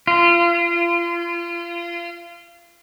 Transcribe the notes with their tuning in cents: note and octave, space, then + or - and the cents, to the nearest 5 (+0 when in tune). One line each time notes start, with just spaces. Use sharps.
F4 -30